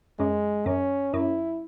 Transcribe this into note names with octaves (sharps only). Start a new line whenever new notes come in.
F#2 G#3
F#2 C#4
F#2 E4